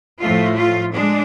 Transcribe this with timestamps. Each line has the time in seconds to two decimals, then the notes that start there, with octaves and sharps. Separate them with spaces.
0.21 A2 F3 A3 F4
0.58 F4
0.94 G#3 D4